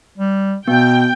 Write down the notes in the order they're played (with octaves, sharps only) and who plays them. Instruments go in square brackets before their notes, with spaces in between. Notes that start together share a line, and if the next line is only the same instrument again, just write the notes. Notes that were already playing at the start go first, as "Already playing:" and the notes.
[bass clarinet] G3
[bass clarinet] B2 [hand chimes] B3 [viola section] G5